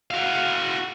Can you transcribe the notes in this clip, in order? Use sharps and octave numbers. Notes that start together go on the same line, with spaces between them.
F#4 F5